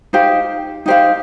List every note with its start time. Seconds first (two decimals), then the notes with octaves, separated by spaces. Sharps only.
0.13 D#4 G4 C5 F5
0.86 D#4 G4 C5 F5